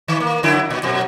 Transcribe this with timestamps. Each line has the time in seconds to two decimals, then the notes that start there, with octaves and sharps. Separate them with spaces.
0.08 D#3
0.20 A#3
0.43 F#2 D3 E4
0.70 A#2
0.83 F#2 B2